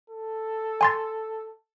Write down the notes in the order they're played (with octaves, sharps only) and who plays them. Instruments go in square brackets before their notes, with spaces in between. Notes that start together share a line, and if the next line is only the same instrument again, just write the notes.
[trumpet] A4
[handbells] G#5 C6 A6